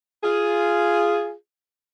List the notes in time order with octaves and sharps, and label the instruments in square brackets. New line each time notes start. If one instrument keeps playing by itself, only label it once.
[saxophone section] F4 G#4